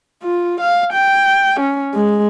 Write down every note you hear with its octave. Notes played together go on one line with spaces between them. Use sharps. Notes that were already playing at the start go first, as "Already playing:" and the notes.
F4
F5
G5
C#4
G#3